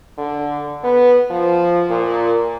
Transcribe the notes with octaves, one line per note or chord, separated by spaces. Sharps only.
D3
B3
F3
A#2